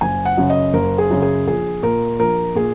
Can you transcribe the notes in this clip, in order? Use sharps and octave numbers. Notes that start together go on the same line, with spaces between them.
F#1 G#5
F#5
F#2 C#3
D#5
F#1 A#4
G#4
F#2 C#3
G#4
A#1 G#4
A#2 A#4
A#1 A#4
A#2 G#4